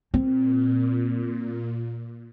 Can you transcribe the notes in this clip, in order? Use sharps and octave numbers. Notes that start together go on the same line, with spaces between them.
A#2 C4